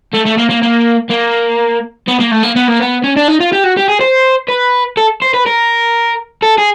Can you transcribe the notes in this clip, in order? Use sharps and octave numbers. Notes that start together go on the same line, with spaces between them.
A3
A3
A#3
A#3
A#3
A#3
B3
A#3
A3
A#3
B3
A#3
B3
C#4
D4
D#4
F4
G4
F#4
G4
G#4
C5
B4
A4
C5
B4
A#4
A4
G#4